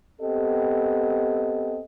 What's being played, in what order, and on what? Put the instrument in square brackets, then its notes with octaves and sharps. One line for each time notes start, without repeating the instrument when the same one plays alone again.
[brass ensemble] B3 C4 G4 A4 D#5